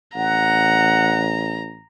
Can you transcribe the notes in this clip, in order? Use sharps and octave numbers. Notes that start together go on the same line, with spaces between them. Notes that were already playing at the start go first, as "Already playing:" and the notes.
A1 F#5 A#5